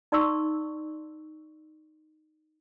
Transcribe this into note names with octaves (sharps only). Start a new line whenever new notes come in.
D#4 D5 C6 C#6 E6